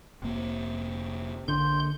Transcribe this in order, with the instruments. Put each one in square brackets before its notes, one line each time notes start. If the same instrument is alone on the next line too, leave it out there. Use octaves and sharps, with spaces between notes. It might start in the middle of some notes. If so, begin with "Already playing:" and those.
[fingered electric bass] F1 A#3 [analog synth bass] C3
[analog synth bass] A#1 [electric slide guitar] D3 [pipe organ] C6 G6